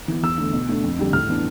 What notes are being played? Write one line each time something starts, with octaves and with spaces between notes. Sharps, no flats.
E3 B3
E2 E6
D3 A3
B2
A3 D4
F2
D3 G3
A2 F6
E3 B3 D4